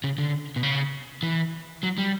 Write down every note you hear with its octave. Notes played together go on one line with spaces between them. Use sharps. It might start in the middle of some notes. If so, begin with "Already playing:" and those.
C#3
D3
B2
C#3
E3
F#3
G3